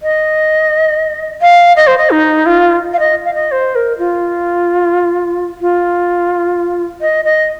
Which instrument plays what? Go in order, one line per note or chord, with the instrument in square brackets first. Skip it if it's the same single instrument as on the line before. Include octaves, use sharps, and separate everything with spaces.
[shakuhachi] D#5
F5
D#5
C5
D#5
D#4
F4
F5
D#5
F5
D#5
C5
A#4
F4
F4
D#5
D#5